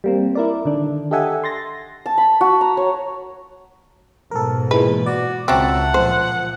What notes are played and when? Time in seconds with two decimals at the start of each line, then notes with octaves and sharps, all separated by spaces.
0.04 G3 A#3 C4
0.35 E4 A#4 D5
0.65 D3 D#3 D4
1.11 G4 A4 D#5 E5 F#5 G#5
1.44 C6 A6 A#6
2.06 A5
2.18 B5
2.41 F#4
2.61 A#5
2.77 C#5
4.31 G#2 B2 A4 A#4
4.71 A#2 E3 G#3 B4
5.06 F#4 D5
5.48 C#2 F#3 C4 E5 F#5 A5
5.94 A#2 F3 C5